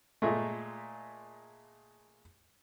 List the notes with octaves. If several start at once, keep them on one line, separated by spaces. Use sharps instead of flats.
A#2 G#3 A3